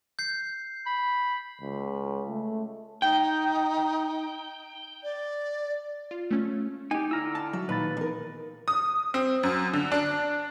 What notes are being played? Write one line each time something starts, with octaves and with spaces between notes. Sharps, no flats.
G6 C7
B5
C#2
A3
D#4 G5
D5
F4
A3 C#4
D#4 G4 G#5
D3 E4 A#5 E6 F6
A5
F#3 E5
D#2 A#2 D#4 B4 B5 A6
E2 D#4 A#4
D#6
C4
F#2
D3
D4